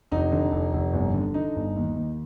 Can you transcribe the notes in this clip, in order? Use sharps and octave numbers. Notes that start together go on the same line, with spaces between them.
F1 D#4
D3
F1
F1
G1
D3
D3 D#4
G1
D#2
D#2